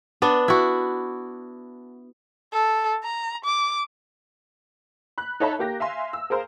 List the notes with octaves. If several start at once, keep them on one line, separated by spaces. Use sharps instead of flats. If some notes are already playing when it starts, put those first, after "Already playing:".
B3 D4
E4 F#4
A4
A#5
D6
B5 F#6
D#4 A4 C#5 E5 A5 B5
A#3 G4 A#6
E5 F5 G#5 C6
E6
G#4 A#4 C5 F5